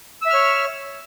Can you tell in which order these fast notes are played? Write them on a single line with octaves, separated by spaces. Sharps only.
E6 E5 F6 C#5